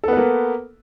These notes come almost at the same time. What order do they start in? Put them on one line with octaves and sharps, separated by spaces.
A4 B3 B4 A#3